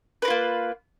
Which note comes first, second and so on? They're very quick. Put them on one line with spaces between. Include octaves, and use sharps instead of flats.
B4 A#4 F4 A#3